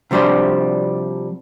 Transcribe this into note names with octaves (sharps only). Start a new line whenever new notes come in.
C3 F3 G3 D4 C5